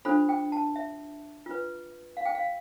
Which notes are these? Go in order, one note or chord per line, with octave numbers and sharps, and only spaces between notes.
D4 F4 A4 C5 B5
G5
A5
E5
F4 B4
F5
G5
F5